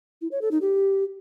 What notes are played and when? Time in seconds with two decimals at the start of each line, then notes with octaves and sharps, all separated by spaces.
0.22 E4
0.32 C#5
0.41 A4
0.51 D#4
0.61 G4